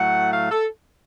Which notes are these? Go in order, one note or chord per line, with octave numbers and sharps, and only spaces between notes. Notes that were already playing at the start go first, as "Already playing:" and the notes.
Already playing: A2 F#3 A3 F#5
F5
A4